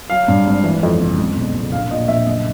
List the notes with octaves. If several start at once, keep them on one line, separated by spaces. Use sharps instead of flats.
F#3 F5
G2
G#1
E3
F2
F#1
C#2
B2
C#2
A#1 F5
A#2 D#5
A#1 E5
F#1 D#5